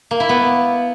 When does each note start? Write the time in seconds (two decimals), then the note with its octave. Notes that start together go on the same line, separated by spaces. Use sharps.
0.11 A#3
0.20 E4
0.29 B3